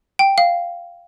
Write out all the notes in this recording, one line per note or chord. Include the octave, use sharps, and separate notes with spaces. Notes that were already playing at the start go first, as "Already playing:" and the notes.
G5
F5